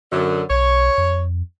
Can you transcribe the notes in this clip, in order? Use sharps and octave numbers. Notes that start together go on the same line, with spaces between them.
F#2 D3
B1 C#5
F2